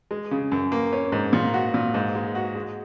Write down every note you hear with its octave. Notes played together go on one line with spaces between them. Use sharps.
G#3
C#3
F#2
A#3
C#4
G#2
A#2
F#4
A#2
G#2
G#3
F#4
G#3